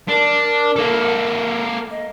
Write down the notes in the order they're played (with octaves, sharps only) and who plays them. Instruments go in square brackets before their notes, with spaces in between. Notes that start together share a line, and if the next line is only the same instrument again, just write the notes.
[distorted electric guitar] D4 [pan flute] A#4
[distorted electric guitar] A#3 A4
[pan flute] D#5